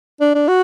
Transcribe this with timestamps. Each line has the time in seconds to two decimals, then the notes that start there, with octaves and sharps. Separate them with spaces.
0.21 D4
0.35 D4
0.48 F#4